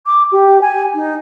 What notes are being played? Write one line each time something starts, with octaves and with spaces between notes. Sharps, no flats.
D6
G4
G#5
D#4